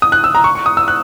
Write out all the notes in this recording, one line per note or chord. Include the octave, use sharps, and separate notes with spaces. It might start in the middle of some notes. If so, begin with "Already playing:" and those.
D#6
F#6
E6
A#5
C#6
C#6
D#6
E6
F#6